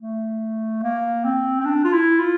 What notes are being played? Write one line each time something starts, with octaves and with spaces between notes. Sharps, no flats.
A3
A#3
C4
C4
D4
F4
E4
F4